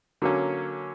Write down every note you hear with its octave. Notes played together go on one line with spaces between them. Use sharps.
D3 F#3 A#3 C#4